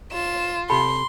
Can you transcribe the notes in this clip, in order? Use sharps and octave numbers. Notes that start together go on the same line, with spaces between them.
F4 E7
C3 G4 A4 B5 C6